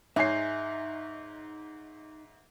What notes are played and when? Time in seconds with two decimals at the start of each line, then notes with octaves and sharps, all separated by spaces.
0.16 G#2 D#4 C#5 E5 G#5 C7